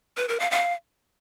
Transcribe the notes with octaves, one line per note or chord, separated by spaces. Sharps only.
B4
A#4
F5
F5